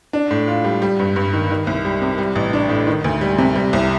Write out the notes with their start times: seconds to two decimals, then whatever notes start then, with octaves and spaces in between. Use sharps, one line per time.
0.13 D4
0.31 A2
0.48 F4
0.64 G3
0.82 G3
0.99 G2
1.16 G2
1.33 D#3
1.50 D#3
1.67 C2
1.85 G3
2.02 C3
2.18 G3
2.36 A1
2.53 D4
2.69 A2
2.87 D#3
3.04 D2
3.21 G3
3.38 C3
3.55 G3
3.73 C2